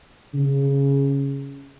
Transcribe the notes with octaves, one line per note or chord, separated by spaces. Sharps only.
C#3